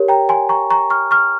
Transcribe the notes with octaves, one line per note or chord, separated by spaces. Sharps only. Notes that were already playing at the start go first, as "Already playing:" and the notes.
Already playing: G4 A#4 C#5
G5 A#5
G#5 C6
A#5 C#6
A#5 C#6
C#6 F6
C#6 F6